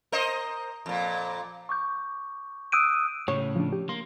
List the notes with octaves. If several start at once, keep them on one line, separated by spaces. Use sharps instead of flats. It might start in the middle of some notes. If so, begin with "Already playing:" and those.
A#4 C5 D#5
F2 A#2
C#6 D6 G6
D#6 E6 F#6 G6 D7 D#7
A2 C#3 C#5
F3 D4
G4
A#3 C6